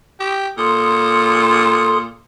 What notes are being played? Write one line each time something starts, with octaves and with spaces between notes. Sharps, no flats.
G4
A#2 A4 C6 D#6